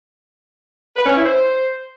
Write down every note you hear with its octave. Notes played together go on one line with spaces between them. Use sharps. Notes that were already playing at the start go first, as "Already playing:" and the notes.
B4
C#4
E4
C5